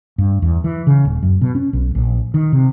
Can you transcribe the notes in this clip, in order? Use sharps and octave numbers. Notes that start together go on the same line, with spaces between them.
G2
E2
E3
C#3
D#1
F#2
B2
C#4
B1
A#1
D#3
C3